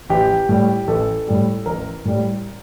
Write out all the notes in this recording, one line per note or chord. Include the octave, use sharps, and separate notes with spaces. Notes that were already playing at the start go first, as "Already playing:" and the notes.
A1 G4
A2 G3
A1 A4
A2 G3
A1 A#4
A2 G3